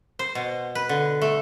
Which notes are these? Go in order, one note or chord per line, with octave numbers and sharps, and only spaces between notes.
C5
B2
B4
D3
A3